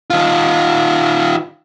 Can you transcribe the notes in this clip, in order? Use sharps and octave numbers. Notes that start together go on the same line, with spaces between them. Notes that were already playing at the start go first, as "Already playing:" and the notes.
D#3 F4